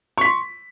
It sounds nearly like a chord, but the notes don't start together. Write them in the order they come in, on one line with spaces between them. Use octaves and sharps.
C#6 B6 C6